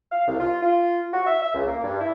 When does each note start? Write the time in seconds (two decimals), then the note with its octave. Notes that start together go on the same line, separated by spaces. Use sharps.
0.12 F5
0.28 C2
0.40 F4
0.62 F4
1.14 F#4
1.26 E5
1.42 E5
1.54 C#2
1.67 A#3
1.84 G2
2.00 E4